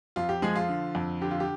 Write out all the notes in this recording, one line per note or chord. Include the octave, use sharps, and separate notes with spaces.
F2 F4
G4
F3 G#3 G#4
F4
D3
F2
D3 G4
F4
G4